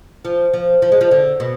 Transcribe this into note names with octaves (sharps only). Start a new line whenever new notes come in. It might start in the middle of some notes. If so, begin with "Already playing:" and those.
F3
F3
F3
G#3
F3
D3
B2